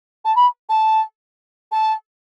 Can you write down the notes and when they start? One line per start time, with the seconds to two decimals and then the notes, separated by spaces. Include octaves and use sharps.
0.25 A5
0.35 B5
0.69 A5
1.72 A5